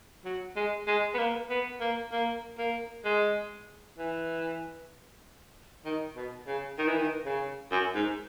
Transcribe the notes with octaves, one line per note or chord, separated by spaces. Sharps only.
F#3
G#3
G#3
B3
A#3
B3
A#3
A#3
A#3
G#3
E3
D#3
B2
C#3
D#3
E3
D#3
C#3
F#2
G#2